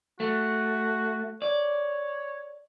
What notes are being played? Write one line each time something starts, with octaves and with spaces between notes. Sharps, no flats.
A3 F#4
C#5 D5